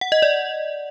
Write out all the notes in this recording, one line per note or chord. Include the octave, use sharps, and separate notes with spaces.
F#5
D#5
D5